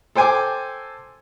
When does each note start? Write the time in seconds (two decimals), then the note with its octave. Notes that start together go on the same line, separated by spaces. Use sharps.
0.15 A4 C5 G5 G#5 C6 D6